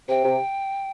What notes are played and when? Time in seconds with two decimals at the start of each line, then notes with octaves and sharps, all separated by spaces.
0.09 C3 G5
0.25 C3